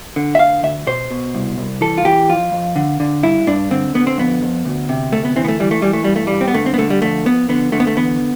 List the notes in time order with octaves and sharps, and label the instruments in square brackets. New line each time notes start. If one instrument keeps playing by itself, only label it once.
[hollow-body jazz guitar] D3
E5
D2 F5
D2 E5
B2 C5
B2
C2
C2
E3 A4
F4
E3 G4
F2 F4
F2
D3
D3
G2 E4
G2 D4
D3 C4
D3 B3
C4
F2 B3
F2
D2
C3
D2 A3
B3
E3 C4
B3
A3
E3 G3
A3
E3 G3
A3
G2 G3
A3
G2 G3
C4
B3
D3 A3
C4
B3
D3 A3
G3
F2 A3
F2 B3
D3 B3
D3 A3
B3
A3
E2 B3